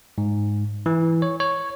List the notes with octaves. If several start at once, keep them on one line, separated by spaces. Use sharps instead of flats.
G#2
E3
C#5
C#5